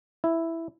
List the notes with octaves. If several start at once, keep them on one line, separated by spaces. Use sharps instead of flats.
E4